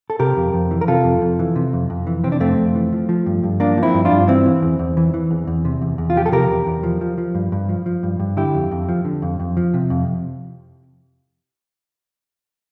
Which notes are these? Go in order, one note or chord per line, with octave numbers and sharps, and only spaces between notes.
A4
C3 G4 A#4
F2
F2
E3
A#4
C3 F4 A4
F2
F2
E3
C3
F2
F2
E3
C3 C4
D4
F2 A3 C4
F2
E3
F3
F3
G2
G2
F3 A#3 D4
F3
C4 E4
G2
D4 F4
G2
E3 C4 E4
E3
E2
E2
E3
E3
E2
E2
C3
E2
E2
F4
F3 G4
A4
C3 G4 A#4
E2
E2
F3
F3
F3
G2
G2
F3
F3
G2
G2
D3 E4 G4
F2
F2
F3
D3
F2
F2
F3
C3
F2